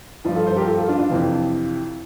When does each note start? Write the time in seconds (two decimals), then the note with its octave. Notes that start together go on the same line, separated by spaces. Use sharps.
0.25 G2 F3
0.35 F4 A4
0.46 A4 C5
0.57 G4 A#4
0.67 F4 A4
0.78 F4 A4
0.88 D4 F4
0.99 D4 F4
1.10 F2 C3 E3